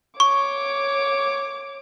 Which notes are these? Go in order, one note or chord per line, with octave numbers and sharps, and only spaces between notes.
C#5 C#6 D6